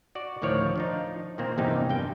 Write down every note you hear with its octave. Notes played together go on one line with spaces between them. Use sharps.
F#4 D5
D2 A2 D#3 F3 C#5 D5
F3 D4 D#4
A#2 D#3 A#3 C4
E2 G2 C3 A#3 D#4 G4
G2 G3 G5